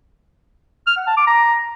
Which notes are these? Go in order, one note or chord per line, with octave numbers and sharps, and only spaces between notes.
F6
F#5
A5
D6
A#5